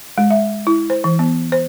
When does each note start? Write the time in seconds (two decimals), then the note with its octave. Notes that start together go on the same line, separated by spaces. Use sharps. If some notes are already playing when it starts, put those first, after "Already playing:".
0.18 G#3
0.30 E5
0.67 E4
0.90 C5
1.04 E3
1.19 B3
1.52 C5